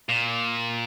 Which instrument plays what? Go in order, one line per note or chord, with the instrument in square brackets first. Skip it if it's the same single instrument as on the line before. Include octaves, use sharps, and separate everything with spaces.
[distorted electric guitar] A#2